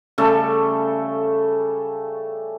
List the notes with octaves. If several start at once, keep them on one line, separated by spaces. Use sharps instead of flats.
C#3 G3 A3 A4